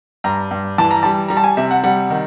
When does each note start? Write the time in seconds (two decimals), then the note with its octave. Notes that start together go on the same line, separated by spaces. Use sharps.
0.24 G2 A#5
0.51 G2
0.78 E3 A5
0.91 A#5
1.03 G3 A5
1.28 G3 A#5
1.37 A5
1.44 G#5
1.57 C3 E5
1.71 F#5
1.84 G3 F#5
2.10 D#3